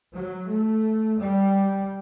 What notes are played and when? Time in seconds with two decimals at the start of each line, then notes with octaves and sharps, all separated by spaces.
0.13 F#3
0.48 A3
1.18 G3